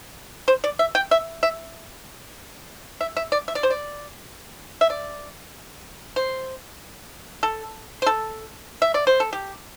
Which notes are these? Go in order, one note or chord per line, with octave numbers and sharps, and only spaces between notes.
C5
D5
E5
G5
E5
E5
E5
E5
D5
E5
D5
C5
D5
E5
D5
C5
A4
C5
A4
E5
D5
C5
A4
G4